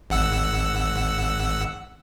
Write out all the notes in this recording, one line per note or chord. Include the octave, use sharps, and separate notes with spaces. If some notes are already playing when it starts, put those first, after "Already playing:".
G#1 F#5 E6